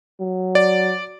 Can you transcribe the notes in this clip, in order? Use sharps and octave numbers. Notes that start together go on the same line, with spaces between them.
F#3
D5